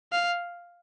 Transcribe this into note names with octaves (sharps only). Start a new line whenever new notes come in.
F5